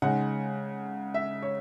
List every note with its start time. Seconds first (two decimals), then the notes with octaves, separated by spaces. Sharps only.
0.02 C#3 G#3 D#4 F#5
1.14 E5
1.43 C#5